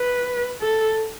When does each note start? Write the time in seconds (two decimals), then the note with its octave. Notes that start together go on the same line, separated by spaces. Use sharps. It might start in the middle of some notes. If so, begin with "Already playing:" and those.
Already playing: B4
0.61 A4